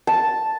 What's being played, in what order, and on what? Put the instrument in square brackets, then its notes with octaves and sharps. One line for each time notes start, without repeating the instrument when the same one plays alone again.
[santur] A5